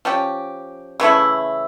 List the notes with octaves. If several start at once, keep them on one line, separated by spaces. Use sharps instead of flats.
F3 C#4 G4
C#3 E3 A3 E4